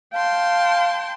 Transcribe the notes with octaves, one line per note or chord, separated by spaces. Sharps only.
F5 G5 A5 C6